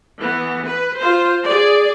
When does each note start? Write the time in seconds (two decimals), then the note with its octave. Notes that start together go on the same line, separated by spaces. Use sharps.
0.20 E3 B3
0.67 B4
0.98 F4 C5
1.46 G#4 D5